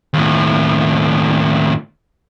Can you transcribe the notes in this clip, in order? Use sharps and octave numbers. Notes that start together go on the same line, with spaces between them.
D#2 A2